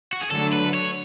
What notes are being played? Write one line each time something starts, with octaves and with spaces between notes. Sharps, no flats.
F#4
G#4
D3 F#3 A3 A4
B4
C#5